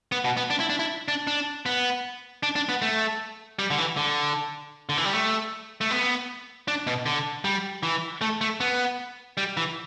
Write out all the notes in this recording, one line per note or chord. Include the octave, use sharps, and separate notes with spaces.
B3
B2
B3
D4
E4
D4
E4
D4
D4
B3
D4
D4
B3
A3
G3
D3
E3
D3
D3
E3
G3
A3
A3
B3
D4
B2
D3
G3
E3
A3
A3
B3
G3
E3